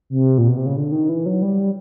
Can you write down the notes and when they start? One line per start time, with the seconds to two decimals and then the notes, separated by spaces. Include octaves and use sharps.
0.10 C3
0.38 A#2
0.48 B2
0.57 C3
0.66 C#3
0.76 D3
0.92 D#3
1.09 E3
1.26 F#3
1.42 G3